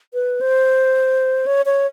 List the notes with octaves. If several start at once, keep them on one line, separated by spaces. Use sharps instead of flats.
B4
C5
C#5
C#5